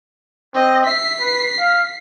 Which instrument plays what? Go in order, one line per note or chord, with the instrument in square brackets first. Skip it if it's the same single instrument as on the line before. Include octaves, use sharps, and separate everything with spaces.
[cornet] C4 [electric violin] D#5
[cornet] E5 [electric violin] B6 C7
[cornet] B4
F5